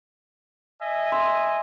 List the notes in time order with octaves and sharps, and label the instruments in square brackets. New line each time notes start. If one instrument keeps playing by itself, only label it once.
[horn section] D#5 E5 G#5
[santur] C6 E6